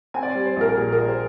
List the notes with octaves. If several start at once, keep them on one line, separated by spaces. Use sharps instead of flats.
C4 G#5
D5
C5
G3
C5
A#1 A#4
A#4
A#2 G#4
A#4
A#1
C5